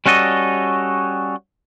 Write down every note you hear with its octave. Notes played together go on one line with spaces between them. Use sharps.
G3 C#4 F#4 A4 D#5